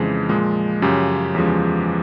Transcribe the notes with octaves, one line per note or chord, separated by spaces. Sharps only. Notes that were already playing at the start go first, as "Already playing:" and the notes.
Already playing: F2 C#3 E3 G#3
A#2 F3 G#3
F#2 C#3 F3 G4
E2 C#3 F3 G#3